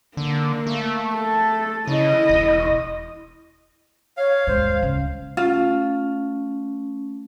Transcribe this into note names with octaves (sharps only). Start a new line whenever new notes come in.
D3 A#3
A3
A4
C#3 E4 D#5
E1
C#5 F5
D#2 G#2 C5
C#2
A3 C#4 F4